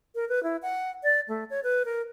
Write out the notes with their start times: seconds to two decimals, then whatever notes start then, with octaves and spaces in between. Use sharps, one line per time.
0.15 A#4
0.29 B4
0.43 E4
0.62 F#5
1.03 D5
1.28 A3
1.50 C#5
1.63 B4
1.85 A#4